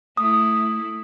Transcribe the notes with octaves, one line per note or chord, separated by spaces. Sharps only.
A3 E4 D#6